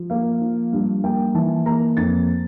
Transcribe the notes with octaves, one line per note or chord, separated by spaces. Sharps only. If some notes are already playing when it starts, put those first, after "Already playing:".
Already playing: F3
A#3 F5
F3
G2
A#3 G5
E3 A5
A#3 A#5
F2 A6